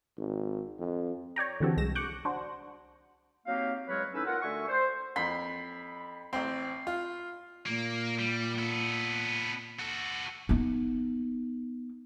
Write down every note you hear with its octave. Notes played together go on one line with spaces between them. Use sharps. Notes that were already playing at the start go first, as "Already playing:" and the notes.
G#1
F2
C#5 D5 G5 A#5
D3 E3 C4 F#4 G4 A4
C2 G#3 A#6 E7
C#6 D6 F#6 G6
D4 F#4 C5
F#3 A#3 C4 D#4 G4 F5
E2 F#3 G#3 A#4 B4 C#5
A2 C#4 D#4 B4 E6
F4 A#4 F#5
D3 A3 F#4 E5 G#5 C#6
C5
F2 B5 C6
A1 C4 C6
F4
A#2 A#3
G3
B3 A4
F#4 A4
B3 D#4